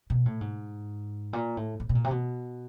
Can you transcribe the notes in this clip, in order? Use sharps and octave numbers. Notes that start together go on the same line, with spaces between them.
B2
A2
G#2
A#2
A2
A2
B2
A#2
C3
B2